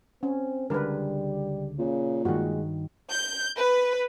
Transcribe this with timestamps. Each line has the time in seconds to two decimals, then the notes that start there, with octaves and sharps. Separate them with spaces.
0.23 C4 C#4
0.70 C#2 D3 G3 G#3 A#4 B4
1.79 A#2 C#3
2.25 G2 D#3 G#3 F#4
3.10 G6
3.56 B4